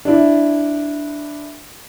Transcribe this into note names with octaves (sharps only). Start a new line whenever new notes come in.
D4 E4